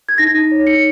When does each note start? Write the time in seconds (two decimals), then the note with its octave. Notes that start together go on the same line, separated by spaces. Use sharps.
0.09 G#6
0.18 D#4 A#6
0.34 D#4
0.51 C#5
0.67 D#4 C#7